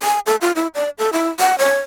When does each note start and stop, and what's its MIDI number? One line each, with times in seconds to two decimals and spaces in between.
0.03 0.19 80
0.26 0.36 69
0.41 0.52 65
0.56 0.67 64
0.75 0.90 74
0.98 1.10 69
1.13 1.29 64
1.39 1.58 78
1.58 1.79 73